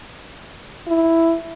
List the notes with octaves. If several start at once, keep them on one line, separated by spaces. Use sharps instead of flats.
E4